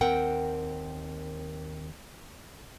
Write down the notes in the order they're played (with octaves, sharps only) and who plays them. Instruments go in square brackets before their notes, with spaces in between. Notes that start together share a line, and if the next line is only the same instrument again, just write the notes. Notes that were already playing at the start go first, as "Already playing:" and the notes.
[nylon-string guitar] D#2 C4 A#4 F#5 G5